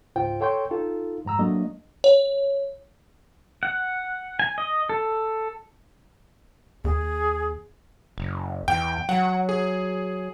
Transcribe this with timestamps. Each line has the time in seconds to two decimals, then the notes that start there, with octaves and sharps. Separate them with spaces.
0.16 C#2 G#2 F4 C5 G5
0.40 A4 C#5 G5 C6 C#6 G6
0.71 D#4 F4 A4
1.25 F2 G#2 A#5 E6
1.39 F#3 A3 A#3 D4 D#5
2.04 C#5
3.63 F#5
4.39 G#5
4.58 D#5
4.89 A4
6.84 D#2 G#4
8.18 F#1
8.68 E2 G5
9.09 F#3 F#5
9.49 G#4